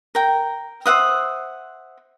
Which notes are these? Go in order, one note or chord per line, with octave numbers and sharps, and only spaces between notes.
A#4 G5
C5 E5 F#5 D#6